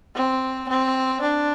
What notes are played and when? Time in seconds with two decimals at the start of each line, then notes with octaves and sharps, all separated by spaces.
0.15 C4
0.69 C4
1.21 D4